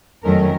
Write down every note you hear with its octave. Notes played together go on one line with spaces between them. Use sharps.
F2 D#3 F#3 A3 C#4 A#4